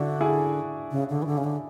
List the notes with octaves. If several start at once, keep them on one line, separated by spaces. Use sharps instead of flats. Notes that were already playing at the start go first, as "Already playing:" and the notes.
Already playing: D3 D4 E4 F#4
E4 G#4
C#3
D3
E3
D3
C#3
D3